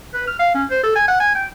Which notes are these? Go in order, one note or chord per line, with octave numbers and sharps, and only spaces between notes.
B4
F6
F5
C#4
C5
A4
G#5
F#5
G#5
G5